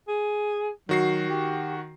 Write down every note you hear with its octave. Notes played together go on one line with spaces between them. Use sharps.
G#4
D#3 F#3 F#4 C7
G4